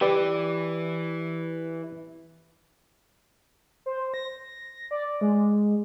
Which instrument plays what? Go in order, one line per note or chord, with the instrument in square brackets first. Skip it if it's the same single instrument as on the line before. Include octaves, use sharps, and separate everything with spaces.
[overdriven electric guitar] E3 [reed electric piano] G4 B4 D5
[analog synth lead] C5
A#6
D5
G#3